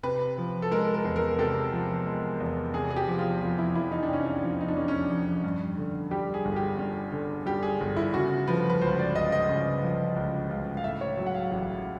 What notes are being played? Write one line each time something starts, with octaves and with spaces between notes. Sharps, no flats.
C3 B4
F3
A4
G#3 A#4
A#4
E2
A#4
C3 A4
F3
G#3
E2
C3 G#4
G#4
G4
F3
F4
F2 F4
E4
F2 E4
D#4
D4
C3 C#4
D4
F3
D#4
D4
F2 C#4
C#4
D4
F2
G2
D3
G3 G4
G#4
G1
G4
G2
D3
G3 G4
G#4
G1
E4
C#3 F#4
F3 B4
B4
C#2 C5
D5
C#2 D#5
D#5
C#3
F3
C#2
C#2
F5
A2 E5
C#5
F#3
F#5
F5
A1